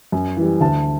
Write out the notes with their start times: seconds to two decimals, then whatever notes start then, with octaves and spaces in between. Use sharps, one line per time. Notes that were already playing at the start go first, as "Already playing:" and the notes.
0.12 F#2
0.37 E3 G3
0.61 D2 A5